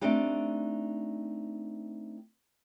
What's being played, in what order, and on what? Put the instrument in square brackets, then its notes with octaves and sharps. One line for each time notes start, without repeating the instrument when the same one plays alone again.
[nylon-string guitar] A3 B3 C4 D4 D#4 G4